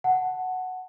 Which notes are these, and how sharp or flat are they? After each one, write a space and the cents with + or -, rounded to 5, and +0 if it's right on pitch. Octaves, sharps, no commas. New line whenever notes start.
F#5 +0 A5 +0